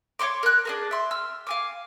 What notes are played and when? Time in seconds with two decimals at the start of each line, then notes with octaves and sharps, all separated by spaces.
0.19 C#5 F5 C6 D6
0.43 A#4 F#6
0.65 D4 G#4 A#4
0.91 E5 C6
1.11 E6 F6
1.47 F5 G#5 D6